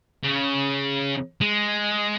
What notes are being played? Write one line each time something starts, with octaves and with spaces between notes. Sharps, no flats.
C#3
G#3